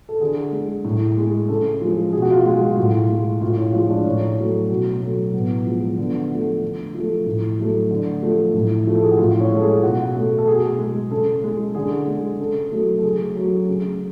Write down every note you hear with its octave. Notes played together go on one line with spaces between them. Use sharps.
A4
D3 G#4
G#3
A2
G#3
C#3 A4
F3 G#3
B2 G#4
F#4
F4
F#4
G#3
F#4
A2 F4
G#3
A2 F4
C#4
F3 G#3 F4
D4
A2 C#4
F#3 A3
B2
F#3 A3
A2 B3
F3 G#3
D3 B3
F3 A3
D3
F3 A3
A2
F#3 A3
D3 D4
F3 A3
A2
F3 A3
A4
G#4
F#4
A2 F4
C#4
G#3
A4
G#4
F4
B2 F#4
A3
A4
B2 G#4
G#3
C#3 A4
G#3
D3 G#4
G#3
C#3 A4
F#3 A3
A4
C#3 G#4
F#3 A3
C#3 G#4